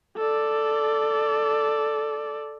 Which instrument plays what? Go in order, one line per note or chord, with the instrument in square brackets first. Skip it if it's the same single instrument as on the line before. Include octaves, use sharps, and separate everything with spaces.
[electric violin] A4 D5